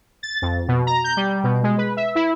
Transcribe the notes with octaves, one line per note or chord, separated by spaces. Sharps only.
A6
F2
B2
A#5
G6
G3
B2
G#3
B4
E5
E4